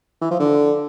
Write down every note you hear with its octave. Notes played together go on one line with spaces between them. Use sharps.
E3
F3
D3